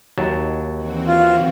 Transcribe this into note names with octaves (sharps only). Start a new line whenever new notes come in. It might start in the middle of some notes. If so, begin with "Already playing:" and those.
D#2 F#3 A5
E3 C4 F#4
F4